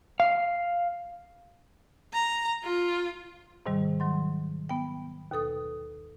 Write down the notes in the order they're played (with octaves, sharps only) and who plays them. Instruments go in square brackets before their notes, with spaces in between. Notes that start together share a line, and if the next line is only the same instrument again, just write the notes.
[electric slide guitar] F5
[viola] A#5
F4
[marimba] G#2 C3 D#3 G3
D#3 F#3 C6
B3 G5
D#2 B2 A4 D#6